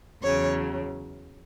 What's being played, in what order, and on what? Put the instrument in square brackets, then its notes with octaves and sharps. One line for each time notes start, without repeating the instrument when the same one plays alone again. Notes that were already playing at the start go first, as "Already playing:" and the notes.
[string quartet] E2 C#3 F#3 C#5